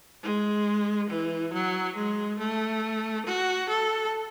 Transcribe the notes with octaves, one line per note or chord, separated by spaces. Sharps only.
G#3
E3
F#3
G#3
A3
F#4
A4